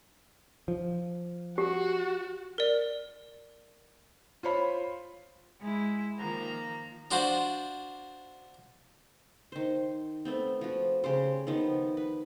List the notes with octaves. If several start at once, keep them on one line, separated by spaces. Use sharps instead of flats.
F3
F#4 G4
A#4 D5
F4 C5 C#5 B5
G#3 E4
D#3 F3 A#3 A#5
D4 F4 F#4 C5
D#3 C5
A3 B3 C4
F3 F#4
C#3 G4 C5
D#3 F3 B3
B4